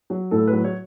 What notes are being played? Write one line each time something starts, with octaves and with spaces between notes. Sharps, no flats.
F#3
A2 A4
B4
F#3
C#5